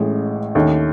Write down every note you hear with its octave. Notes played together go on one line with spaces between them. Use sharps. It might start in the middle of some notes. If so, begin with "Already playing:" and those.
Already playing: A1 A2 E3 G#3 C#4
D#2 D#3 A3 C#4